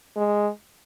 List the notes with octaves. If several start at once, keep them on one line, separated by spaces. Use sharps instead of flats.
G#3